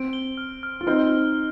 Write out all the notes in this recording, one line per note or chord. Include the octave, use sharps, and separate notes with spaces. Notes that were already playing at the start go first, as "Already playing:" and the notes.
Already playing: C4 D7
G7
F6
F6
F4
C4 D#4 F6